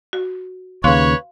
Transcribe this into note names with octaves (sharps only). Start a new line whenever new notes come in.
F#4
D#2 C#3 B4 C#5 F5 C6 F#6